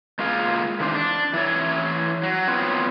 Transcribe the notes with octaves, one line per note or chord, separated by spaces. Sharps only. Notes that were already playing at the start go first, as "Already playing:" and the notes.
G#3 A#3 F4 G#4 F5
D#3 E3 C4 D4 C5
D4
E3 E4 C#5
F#3
B3 C4 F4 C#5